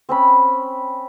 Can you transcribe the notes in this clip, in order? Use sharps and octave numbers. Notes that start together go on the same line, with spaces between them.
C4 C#4 B5